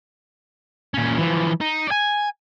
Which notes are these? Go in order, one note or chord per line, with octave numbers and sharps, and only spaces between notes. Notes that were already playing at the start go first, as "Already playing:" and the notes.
A#2 C#4
E3 F3
D#4
D5 G#5